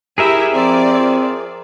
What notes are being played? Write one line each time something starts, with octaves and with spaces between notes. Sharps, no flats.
E4 G4 G#4 A#4 E5
F3 C4 D5